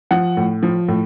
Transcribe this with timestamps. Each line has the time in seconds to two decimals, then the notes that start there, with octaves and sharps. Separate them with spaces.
0.11 F3 F#5
0.37 A2
0.63 F3
0.89 A2